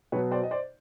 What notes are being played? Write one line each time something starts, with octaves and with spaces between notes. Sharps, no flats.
B2 F#3 B3 B4 C#5
C5 D5
D#5
C5 D5